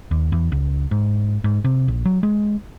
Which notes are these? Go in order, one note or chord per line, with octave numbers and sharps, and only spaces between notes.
D#2
E2
C#2
G#2
G#2
C3
A#1
F#3
G#3